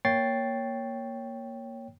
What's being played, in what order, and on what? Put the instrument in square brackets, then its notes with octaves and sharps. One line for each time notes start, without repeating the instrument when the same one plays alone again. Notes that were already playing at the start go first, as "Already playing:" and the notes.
[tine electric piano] A#3 C#5 G5 A6 C7